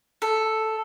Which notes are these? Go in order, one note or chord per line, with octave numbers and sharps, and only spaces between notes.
A4